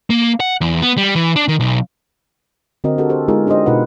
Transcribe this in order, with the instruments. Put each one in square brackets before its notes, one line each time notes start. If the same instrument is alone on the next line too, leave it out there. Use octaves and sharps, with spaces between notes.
[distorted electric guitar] A#3
F#5
E2
B3
G3
E3
D4
D#3
B1
[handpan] D3 C4 F#4 A#4 D#5
F#4 G4 A4 A#4
G4 A4 C5
G#3 B3 D#4 F4 G#4 A#4
D4 G4 A4 C5 D#5
B2 D#4 F4 A#4 B4 F#5